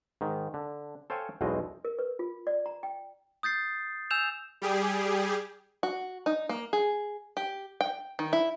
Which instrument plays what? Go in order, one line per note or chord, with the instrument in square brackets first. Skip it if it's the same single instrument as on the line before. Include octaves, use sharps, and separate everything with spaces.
[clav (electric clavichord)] G#2 D#3
D3
A4 C5 C#5 F5 G5 G#5
B1 E2 B2 G#3 C4 D#5
[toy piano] A#4
B4
F4
D5
A#5
G5
[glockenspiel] D#6 G6 A6 C7
G#5 E6 G6 E7 F7
[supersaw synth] G3 G4 G#4
[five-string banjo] F#4
D#4
A#3
G#4
G4
G5
D#3
E4